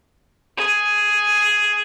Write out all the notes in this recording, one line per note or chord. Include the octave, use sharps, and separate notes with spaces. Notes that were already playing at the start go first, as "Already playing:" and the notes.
G#4